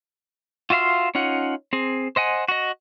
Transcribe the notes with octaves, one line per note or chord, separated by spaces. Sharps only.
F4 F#4 E5 F5 C6
C#4 D#4 F4 F#5
C4 G#4
C5 D#5 F#5 G#5
F#4 D#5